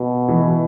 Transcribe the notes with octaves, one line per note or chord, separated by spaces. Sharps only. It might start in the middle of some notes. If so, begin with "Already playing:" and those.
Already playing: B2
E3